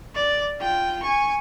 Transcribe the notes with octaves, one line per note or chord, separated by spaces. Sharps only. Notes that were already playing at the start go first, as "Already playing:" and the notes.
D5
F4 G5
G#5 C#6